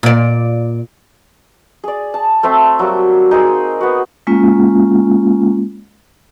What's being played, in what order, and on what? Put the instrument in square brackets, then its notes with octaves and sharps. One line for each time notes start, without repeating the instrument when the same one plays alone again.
[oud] A#2 D5
[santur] G#4 D5
A5
A3 C4 C5 E5
F#3 G3 A#3 D6
D#4 G#4 A#4 C5
B3 F#4
[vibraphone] G#3 A#3 C#4 F4